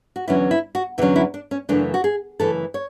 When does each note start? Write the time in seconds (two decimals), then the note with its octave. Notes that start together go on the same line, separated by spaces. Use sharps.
0.16 F#4
0.28 E2 D3 F#3 C#4 E4
0.51 E4
0.75 F#4
0.98 E2 D3 F#3 C#4 E4
1.16 E4
1.34 D4
1.51 C#4
1.69 F#2 C#3 E3 A3 D4
1.94 F#4
2.04 G#4
2.39 F#2 C#3 E3 A3 A4
2.74 C#5